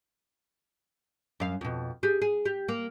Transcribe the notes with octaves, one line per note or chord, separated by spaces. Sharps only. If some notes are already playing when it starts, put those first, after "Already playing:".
F#2 F5
F2 B2
G4 G#4
G#4
G4
A#3